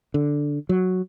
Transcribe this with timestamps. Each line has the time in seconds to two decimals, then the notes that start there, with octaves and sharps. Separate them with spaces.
0.14 D3
0.69 F#3